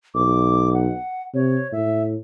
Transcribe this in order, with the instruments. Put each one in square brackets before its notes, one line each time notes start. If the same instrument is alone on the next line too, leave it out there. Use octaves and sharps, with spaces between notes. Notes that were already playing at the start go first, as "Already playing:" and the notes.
[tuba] B1 [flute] D6
[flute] F#5
[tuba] C3 [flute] C#5
[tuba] A2 [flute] E5